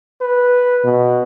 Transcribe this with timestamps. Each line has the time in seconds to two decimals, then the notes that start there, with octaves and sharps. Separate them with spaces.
0.22 B4
0.84 B2